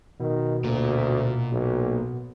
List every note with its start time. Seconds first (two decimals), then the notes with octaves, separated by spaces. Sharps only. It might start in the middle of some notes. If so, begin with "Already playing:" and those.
0.20 B2 D#3
0.64 D2 A#2
1.52 B1